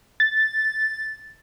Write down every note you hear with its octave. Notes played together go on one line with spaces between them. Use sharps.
A6